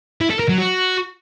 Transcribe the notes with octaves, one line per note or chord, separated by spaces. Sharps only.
E4
A4
A#4
F#3
F#4